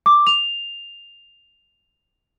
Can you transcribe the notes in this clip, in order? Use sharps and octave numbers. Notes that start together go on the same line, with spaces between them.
D6
F7